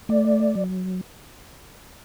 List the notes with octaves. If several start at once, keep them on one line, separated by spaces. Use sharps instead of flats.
A3 D5
F#3